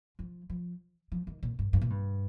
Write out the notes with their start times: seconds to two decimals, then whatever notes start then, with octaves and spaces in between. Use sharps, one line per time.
0.19 F3
0.50 F3
1.12 F3
1.27 D#3
1.43 A#2
1.59 G2
1.73 G2
1.82 A#2
1.90 G2